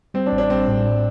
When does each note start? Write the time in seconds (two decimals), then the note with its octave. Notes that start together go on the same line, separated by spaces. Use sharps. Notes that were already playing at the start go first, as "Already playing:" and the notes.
0.14 G3 C4
0.26 D4
0.32 A1
0.38 D4
0.50 G3 C4
0.68 A2
0.85 D4